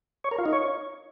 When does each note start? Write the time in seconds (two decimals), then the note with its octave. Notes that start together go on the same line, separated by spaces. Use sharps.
0.24 C#5
0.31 A#4
0.39 F4
0.46 D#4
0.53 C#5